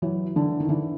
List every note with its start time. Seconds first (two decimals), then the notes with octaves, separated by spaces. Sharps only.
0.02 E3 F#3
0.36 D3 E3
0.60 D#3
0.69 D3 E3